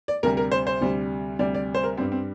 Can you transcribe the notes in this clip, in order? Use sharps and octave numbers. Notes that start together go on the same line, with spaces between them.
D5
D2 C3 G3 A#4
A#4
C5
C5
D2 C3 G3
D2 C3 G3 D5
D5
C5
A#4
G2 G3 C4
C4